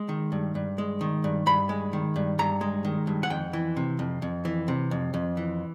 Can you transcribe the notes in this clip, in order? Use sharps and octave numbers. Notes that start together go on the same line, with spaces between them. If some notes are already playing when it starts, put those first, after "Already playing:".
Already playing: G#3
D#3
G2
G2
G#3
D#3
G2
G2 B5
G#3
D#3
G2
G2 A#5
G#3
D#3
G2
F#5
F2 G5
E3
C3
F2
F2
E3
C3
F2
F2
E3